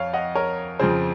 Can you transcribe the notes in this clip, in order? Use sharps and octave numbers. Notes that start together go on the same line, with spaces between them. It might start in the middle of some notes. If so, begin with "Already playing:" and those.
Already playing: F2 C#5 F5
D#5 F#5
A#4 C#5
F2 C#3 F3 G#4 C5